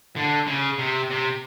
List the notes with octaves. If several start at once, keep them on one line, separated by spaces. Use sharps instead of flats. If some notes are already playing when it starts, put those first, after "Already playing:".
D3
C#3
C3
C3